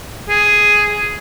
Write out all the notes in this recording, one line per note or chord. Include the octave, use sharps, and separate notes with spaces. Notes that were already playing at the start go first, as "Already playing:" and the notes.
G#4